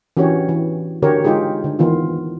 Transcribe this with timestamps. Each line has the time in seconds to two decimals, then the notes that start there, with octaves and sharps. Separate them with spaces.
0.17 E3 C#4 D4 F#4 G4 C#5
0.49 E3
1.02 D3 F#4 G4 A#4 C#5
1.24 G#3 D#4 F4 G4 G#4
1.64 D3
1.79 D#3 E3 B3 F4